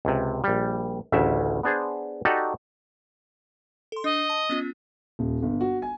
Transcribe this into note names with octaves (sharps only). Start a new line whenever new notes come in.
C#2 C3
A#1 G3
A1 D2 C#3 E5
B3 D4 G#4 C5
D#4 F#4 G4 A4 D5
A4 C6
D4 D#5
A5
B3 C#4 F4
D#1
G1
F#4
G#5